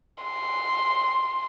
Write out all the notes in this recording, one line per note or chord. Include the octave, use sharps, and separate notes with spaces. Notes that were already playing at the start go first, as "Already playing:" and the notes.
C6